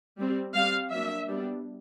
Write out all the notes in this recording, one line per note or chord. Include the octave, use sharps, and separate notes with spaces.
G3 C4
G3 C4 F5
F#3 A#3 D4 E5
G3 B3 D4